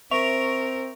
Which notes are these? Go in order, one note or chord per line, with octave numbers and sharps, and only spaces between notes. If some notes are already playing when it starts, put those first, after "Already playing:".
C4 A#4 E5 C#6 F7